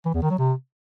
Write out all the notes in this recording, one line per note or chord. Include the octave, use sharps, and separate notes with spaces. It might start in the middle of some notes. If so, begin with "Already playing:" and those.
E3
E2
D#3
F#3
C3